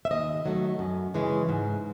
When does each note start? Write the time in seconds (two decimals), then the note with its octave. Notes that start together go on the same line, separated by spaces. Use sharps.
0.05 E5
0.11 D#2 D#5
0.45 D#3 F#3 A3
0.79 F#2
1.14 C#3 E3 G#3
1.49 G#2